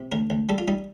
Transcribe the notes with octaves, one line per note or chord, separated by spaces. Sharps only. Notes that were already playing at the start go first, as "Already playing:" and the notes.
Already playing: C3
D2 A#4
D2
G3 A4
F4
G3 D#4